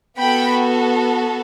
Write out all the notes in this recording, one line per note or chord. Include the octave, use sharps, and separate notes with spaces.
B3 F#4 A4 G5 B5